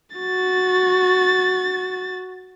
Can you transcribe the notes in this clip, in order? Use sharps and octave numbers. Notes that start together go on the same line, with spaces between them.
F#4 A6